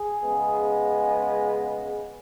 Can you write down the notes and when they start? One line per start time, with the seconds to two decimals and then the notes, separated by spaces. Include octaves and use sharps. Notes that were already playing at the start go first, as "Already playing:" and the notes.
Already playing: G#4
0.24 C#3 G#3 B3